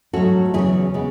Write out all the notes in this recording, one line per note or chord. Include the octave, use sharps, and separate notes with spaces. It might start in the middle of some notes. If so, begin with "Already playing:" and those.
G#2 F#3 A3 C#4 F#4 A4
E2 C#3 F#3 C#4 E4 G#4
C#3 G#3 B3